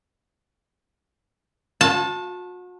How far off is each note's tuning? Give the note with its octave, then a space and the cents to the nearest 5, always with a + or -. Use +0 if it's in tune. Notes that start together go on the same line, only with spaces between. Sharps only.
F#4 -40 A5 +0